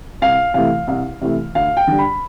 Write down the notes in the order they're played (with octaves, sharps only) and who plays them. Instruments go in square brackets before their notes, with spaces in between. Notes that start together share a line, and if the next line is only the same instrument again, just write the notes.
[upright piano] C2 F5
C3 E3 A3 F5
C2
C3 E3 A3
D2 F5
G5
D3 G3 D4
B5